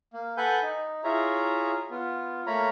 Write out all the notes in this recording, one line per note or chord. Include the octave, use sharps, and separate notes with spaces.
A#3
A4 B4 F#5 G#5 G6
D#4
E4 F4 G#4 C#5 E5 A#5
B3 F4
A3 A#3 C#5 A#5 B5